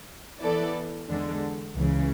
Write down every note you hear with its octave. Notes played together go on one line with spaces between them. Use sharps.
E3 B3 E4 A4 D5
E2 D3 G#3 D4
C#2 C#3 E3